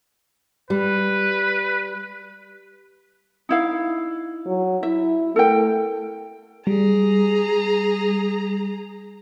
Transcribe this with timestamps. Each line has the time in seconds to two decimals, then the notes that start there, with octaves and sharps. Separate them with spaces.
0.70 G3 B4
3.49 D#4 E4 F5
4.46 F#3
4.83 E4 E5
5.36 A3 A4 A#4 G5
6.67 G3 G#4 A#5